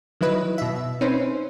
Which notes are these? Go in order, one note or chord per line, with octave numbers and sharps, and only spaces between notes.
D#3 F#3 E4 B4 D#5
B2 E5
C4 C#4 D#4 B4 C5